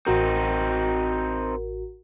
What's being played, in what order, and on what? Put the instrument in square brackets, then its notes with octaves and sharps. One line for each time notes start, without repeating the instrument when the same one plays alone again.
[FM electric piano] A1 F#4 A#4 [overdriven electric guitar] C4 D#4